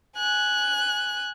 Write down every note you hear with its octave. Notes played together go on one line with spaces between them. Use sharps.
G#5 F#6